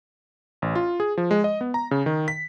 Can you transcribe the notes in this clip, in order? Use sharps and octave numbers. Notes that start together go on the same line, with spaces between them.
A1
F4
G#4
F3
G#3
D#5
B3
A#5
C#3
D#3
B6